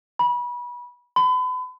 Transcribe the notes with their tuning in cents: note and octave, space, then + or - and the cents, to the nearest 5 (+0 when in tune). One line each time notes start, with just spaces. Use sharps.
B5 -30
B5 +35